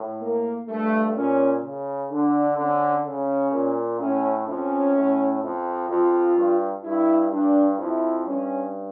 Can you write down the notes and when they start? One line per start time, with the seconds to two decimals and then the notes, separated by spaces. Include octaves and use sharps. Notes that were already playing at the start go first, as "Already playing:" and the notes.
Already playing: A2
0.21 A#3
0.68 G2 A3
1.15 A#2 C#4
1.63 C#3
2.11 D3 D4
2.57 D3 C#4
3.06 C#3 C#4
3.52 A#2
3.99 A2 C#4
4.47 F2 C#4
4.95 A2
5.42 F2
5.90 F2 F4
6.37 G2
6.84 G2 E4
7.31 G2 D4
7.79 F2 E4
8.26 G2 C#4